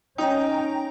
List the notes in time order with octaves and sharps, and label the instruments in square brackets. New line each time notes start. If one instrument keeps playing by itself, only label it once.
[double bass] C#4 [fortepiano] D#4 [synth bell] G5 A#5